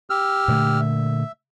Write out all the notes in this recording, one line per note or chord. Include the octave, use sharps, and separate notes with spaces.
G4 E6 F6
A#2 D3 A3
E5